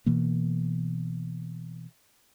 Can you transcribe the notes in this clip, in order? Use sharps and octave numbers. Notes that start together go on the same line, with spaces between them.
B2 E3 A#3